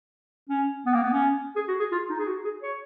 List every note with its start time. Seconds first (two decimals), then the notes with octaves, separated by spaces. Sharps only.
0.49 C#4
0.86 B3
0.94 A#3
1.03 B3
1.12 C#4
1.56 G#4
1.68 F#4
1.79 G#4
1.92 F4
2.10 D#4
2.19 G#4
2.27 F#4
2.44 G#4
2.62 C#5